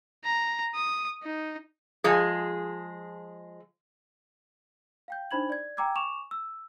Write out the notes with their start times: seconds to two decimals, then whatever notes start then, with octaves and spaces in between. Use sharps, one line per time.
0.24 A#5
0.75 D#6
1.23 D#4
2.04 F3 G#3 G#4
5.08 F5 G5 G6
5.31 D4 D#4 C5 B5 G#6 F#7
5.50 D5 G#6
5.77 G5 G#5 A#5 D6 E6 G#6
5.95 G#5 C#6 D6 E7 F7
6.31 E6